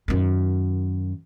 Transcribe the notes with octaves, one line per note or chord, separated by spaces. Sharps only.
F#2 D#3